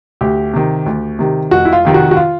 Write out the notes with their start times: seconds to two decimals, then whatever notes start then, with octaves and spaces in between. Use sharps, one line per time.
0.21 D2 G4
0.54 C3 D#3
0.86 D2
1.19 C3 D#3
1.51 F1 F#4
1.65 E4
1.73 F4
1.85 F2 C3 D#3
1.94 F#4
2.11 F#4
2.16 F4